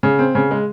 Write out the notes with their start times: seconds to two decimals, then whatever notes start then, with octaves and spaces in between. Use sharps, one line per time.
0.03 C#3
0.19 C4
0.35 C#3
0.51 G#3